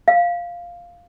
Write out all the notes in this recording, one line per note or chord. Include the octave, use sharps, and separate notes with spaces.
F5